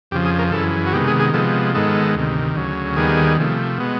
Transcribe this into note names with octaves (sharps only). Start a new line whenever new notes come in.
F2 C#3 F3 G4
G#4
A#4
F#2 C#3 E3 A4
F#4
C3 D#3 G#3 B3 G4
G#4
G#4
C3 F3 G#3 B3 A4
G#2 D#3 G#3 B3 A4
D2 C3 D#3
D2 C#3 F#3
D#2 D#3 G3 B3 G#4
C3 F3 A3
B2 G#3 B3